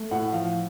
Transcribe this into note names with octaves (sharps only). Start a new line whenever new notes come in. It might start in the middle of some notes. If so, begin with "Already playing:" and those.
Already playing: A3
A2 F#5
F3 F5